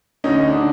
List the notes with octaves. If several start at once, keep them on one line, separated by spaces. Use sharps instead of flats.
D2 C#4 D#4
D4
D3